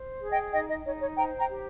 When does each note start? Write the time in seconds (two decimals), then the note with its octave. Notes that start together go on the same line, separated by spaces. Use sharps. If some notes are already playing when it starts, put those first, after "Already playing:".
Already playing: C5
0.20 G#4
0.30 D#5 G5
0.52 D#4 D#5 G5
0.69 D#5
0.85 D#4 C#5
1.01 C#5
1.16 C5 G5 A#5
1.38 G5 A#5
1.49 G4